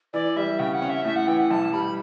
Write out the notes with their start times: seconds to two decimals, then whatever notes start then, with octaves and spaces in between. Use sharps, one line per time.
0.13 E3 D5
0.36 G3 E5
0.59 C#3 G5
0.74 F#5
0.82 C#4
0.89 E5
1.05 A2 E5
1.16 F#5
1.27 E3 G5
1.39 F#5
1.50 B1 A5
1.73 G3 B5